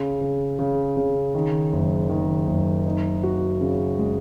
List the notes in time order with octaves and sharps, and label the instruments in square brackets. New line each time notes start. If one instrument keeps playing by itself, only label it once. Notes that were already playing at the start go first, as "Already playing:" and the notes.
Already playing: [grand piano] C#3
C#3
C#3
C#3
D#3
F#1
D#3
F#1
D#4
F#4
C#3
G#3